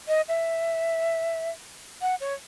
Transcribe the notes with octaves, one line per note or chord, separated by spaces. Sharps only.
D#5
E5
F#5
C#5